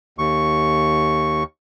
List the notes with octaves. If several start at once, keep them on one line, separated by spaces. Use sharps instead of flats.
D#2 C#6